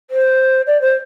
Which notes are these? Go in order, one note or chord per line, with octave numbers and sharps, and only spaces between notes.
C5
D5
C5